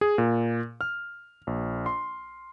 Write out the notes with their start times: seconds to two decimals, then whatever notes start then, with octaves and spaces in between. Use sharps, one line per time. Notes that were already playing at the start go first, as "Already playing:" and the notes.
0.01 G#4
0.18 A#2
0.81 F6
1.47 A#1
1.86 C6